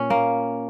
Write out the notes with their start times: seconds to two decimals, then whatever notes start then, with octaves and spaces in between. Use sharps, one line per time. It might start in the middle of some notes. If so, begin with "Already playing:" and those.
Already playing: A#2 C#4
0.10 A#3